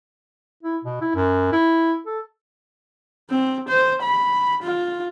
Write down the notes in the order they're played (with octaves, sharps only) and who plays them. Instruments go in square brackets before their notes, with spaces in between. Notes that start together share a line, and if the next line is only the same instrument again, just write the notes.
[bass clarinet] E4
B2
E4
F#2
E4
A4
[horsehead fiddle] C4
C5
B5
F4